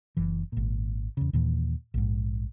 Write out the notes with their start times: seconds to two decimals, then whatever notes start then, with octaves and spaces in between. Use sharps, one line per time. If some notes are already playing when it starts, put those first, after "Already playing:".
0.17 F#1 E3
0.52 G#1 A#2
1.17 E2 C#3
1.33 D#2 A#2 E3
1.94 A#1 G#2